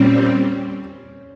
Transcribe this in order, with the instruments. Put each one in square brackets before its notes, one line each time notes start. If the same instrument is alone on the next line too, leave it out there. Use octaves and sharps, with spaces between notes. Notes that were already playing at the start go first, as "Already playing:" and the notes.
Already playing: [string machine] A#2 G3 C4 [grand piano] C#4